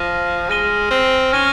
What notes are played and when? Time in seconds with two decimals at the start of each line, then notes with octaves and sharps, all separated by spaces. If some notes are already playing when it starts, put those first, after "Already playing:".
Already playing: F3 F6 A#6 D#7
0.50 G#3 F6 A#6 D#7 G7
0.91 C4
1.32 C#4 F6 A#6 D#7 G7